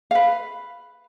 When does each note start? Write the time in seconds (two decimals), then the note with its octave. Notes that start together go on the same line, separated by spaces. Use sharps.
0.11 B4 F5